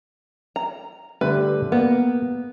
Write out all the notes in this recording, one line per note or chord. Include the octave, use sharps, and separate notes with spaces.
A#5
D3 G3 A3 B4
A#3 B3